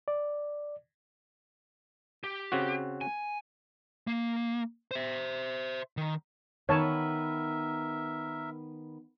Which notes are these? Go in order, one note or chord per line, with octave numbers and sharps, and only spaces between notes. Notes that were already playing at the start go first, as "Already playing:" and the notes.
D5
G4
C#3 C4 F#4
G#5
A#3
C5 E5
D#3
D#3 B3 A#4 B4 C#5 E5 A5